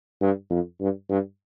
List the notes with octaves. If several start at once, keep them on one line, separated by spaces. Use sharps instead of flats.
G2
F2
G2
G2